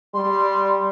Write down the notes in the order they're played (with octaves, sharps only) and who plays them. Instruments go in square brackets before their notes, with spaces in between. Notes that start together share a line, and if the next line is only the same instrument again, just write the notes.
[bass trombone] G3 [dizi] C6